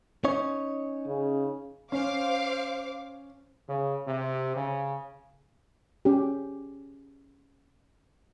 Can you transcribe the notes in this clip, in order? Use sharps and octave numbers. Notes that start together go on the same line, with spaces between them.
C#4 D#4 C#5
C#3
C#4 C5 F5 D6
C#3
C3
C#3
C#4 G4